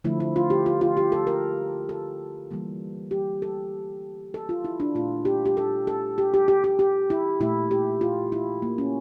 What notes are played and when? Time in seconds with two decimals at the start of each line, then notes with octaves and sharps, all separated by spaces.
0.04 D3 F3 A3 E4
0.20 E4
0.36 F4
0.50 G4
0.66 F4
0.81 F4
0.97 G4
1.12 A4
1.27 A#4
1.89 A4
2.51 E3 G3 A#3
3.11 G4
3.42 A4
4.34 A4
4.49 F4
4.64 E4
4.80 D4
4.95 A#2 A3 F4
5.25 G4
5.46 G4
5.57 A4
5.87 A4
6.18 G4
6.34 G4
6.48 G4
6.64 G4
6.79 G4
7.10 E4
7.40 A#2 A3 E4
7.71 G4
8.01 F4
8.32 E4
8.62 A#3
8.78 C#4